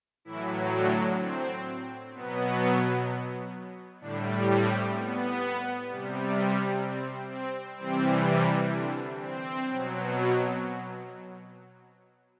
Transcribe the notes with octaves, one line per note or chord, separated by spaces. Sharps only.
A2 E3 F#3 E4
D3 D4
C4
B2 F#3 B3
A2 D3 G3 D4
C4
B3
C3 G3
C4
C4
C3 E3 G3 C4
D3 D4
C4
B2 F#3